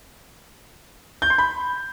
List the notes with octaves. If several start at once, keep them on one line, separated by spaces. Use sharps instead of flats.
G6
C6
B5